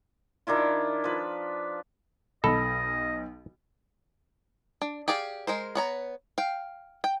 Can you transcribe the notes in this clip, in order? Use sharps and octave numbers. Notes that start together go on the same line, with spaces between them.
D#3 D4 E4 F4
F3 B4
B1 A4 D#5 B5
D4
G4 G#4 D5 F5
G#3 A#4 C5
B3 C#5 A#5
F5 G5
G5